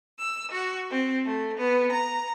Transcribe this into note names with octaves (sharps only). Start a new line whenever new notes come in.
E6
F#4
C4
A3
B3
A#5